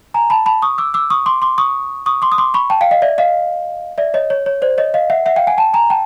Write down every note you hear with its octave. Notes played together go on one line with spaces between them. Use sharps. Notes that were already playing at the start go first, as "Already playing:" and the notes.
G#5 A#5
A5 B5
A5 B5
C#6 D#6
D6 E6
D6 E6
C#6 D#6
C6 D6
C6 D6
C#6 D#6
C#6 D#6
C6 D6
D#6
C6 D6
B5 C#6
G5 A5
F5 G5
D#5 F5
D5 E5
D#5 F5
D5 E5
C#5 D#5
C#5
C#5
C5 D5
C#5 D#5
D#5 F5
E5 F#5
E5 F#5
F5 G5
F#5 G#5
G5 A5
G#5 A#5
G5 A5